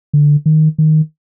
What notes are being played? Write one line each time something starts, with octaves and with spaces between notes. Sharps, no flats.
D3
D#3
D#3